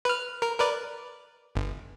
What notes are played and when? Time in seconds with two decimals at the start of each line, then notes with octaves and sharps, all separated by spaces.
0.05 B4 F6
0.42 A#4
0.58 A#4 B4 D5
1.55 G1